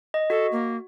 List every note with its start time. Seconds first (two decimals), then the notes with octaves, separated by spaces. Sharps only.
0.14 D#5
0.30 F#4 A4
0.52 A#3